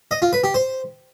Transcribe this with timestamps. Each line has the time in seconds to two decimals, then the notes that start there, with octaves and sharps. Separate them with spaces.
0.11 D#5
0.22 F4
0.33 B4
0.44 G4
0.54 C5